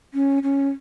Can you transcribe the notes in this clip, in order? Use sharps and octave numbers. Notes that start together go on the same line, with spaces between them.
C#4
C#4